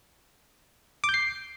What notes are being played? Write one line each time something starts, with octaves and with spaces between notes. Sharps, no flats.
D6
G6
C7